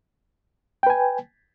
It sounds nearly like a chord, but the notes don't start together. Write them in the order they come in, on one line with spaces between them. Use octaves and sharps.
G5 B4 G#5